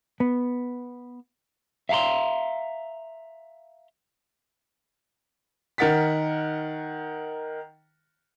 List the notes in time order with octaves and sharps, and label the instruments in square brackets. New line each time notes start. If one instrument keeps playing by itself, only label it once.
[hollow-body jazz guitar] B3
[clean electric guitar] E5 F5 A5 A#5 C6
[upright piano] D#3 A#4 F#5 A6 B6